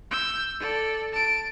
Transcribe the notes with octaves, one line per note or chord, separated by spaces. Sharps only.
E6 G6
A4 D5
A5 D7